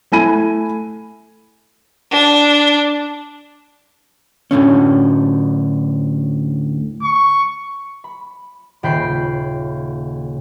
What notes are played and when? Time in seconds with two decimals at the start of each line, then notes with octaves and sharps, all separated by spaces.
0.12 A3 E4 G#5 B5 D#7
2.11 D4
4.51 D2 A2 D3 C#4
7.02 C#6
8.04 B5
8.83 D#1 C#3 G5 B5 B6 C7